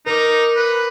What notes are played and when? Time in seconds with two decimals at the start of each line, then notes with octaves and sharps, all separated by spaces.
0.06 D#4 A#4 D6
0.56 B4